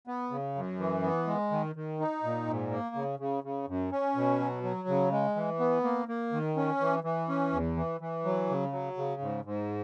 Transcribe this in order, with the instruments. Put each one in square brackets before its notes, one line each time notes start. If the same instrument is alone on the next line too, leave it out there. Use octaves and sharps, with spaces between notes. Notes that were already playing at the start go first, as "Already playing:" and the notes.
[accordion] B3
C#3
F#2
E3
B3
G#3
D#3
D#3
D#4
A#2
G#2
A#3
C#3
C#3
C#3
F#2
C#4
B2
F#3
F#3
C#3
G#3
E3
B3
A#3
A#3
D#3
C#4
E3
E3
C#4
E2
E3
E3
F#3
C#3
F#3
C#3
G#2
G#2